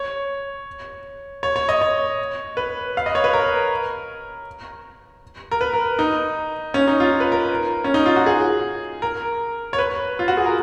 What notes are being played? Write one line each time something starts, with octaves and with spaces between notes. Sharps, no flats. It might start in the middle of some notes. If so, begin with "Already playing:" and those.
Already playing: C#5
C#5
C#5
D#5
C#5
B4
F5
D#5
C#5
B4
A#4
A#4
B4
A#4
D#4
C#4
D#4
F4
B4
A#4
C#4
D#4
F4
F#4
G#4
A#4
C#5
B4
F4
F#4
G#4
A#4